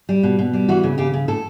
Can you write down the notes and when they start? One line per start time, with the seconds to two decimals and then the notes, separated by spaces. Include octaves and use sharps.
0.09 G3
0.23 B2
0.39 B2
0.53 G3
0.68 E3 F#4
0.83 C#3
0.98 C#3 G4
1.14 C#3
1.28 A2 A4